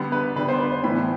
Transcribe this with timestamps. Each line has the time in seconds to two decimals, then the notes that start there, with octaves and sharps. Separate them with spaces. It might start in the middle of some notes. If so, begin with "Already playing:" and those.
Already playing: D3 G3 B3
0.12 B4
0.36 D3 G3 B3 B4
0.49 C5
0.60 B4
0.72 C5
0.84 A2 E3 B3 B5